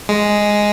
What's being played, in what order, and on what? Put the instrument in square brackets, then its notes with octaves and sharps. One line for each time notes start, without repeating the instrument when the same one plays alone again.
[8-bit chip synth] G#3